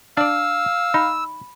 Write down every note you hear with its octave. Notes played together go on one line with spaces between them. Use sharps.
D4 D5 F5 E6
D#4 B5